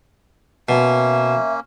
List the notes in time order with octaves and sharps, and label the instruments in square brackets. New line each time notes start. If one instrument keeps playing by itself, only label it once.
[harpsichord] B2 [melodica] A#3 C#4 [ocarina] E5